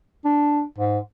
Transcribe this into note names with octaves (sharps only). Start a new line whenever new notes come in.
D4
G#2